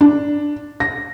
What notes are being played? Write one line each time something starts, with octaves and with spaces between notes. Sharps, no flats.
D4
A#6